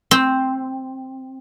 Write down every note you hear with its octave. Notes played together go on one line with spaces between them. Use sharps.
C4